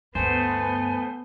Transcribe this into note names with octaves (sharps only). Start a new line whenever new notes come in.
D2 G2 A3 B3 C5 G#5